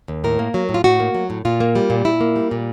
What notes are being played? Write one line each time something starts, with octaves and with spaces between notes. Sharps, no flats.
D#2
A2 A#4
A#3
F#3
A2
F4
A2 F#4
A#3
F#3
A2
A#2 F4
A#3
G3
A#2
A#2 E4
A#3
G3
A#2